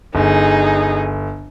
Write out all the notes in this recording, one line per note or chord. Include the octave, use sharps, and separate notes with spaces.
G1 D#4 G#4